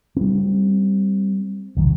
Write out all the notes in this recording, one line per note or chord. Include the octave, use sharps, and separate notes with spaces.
G3 C4
E1 C2 D#3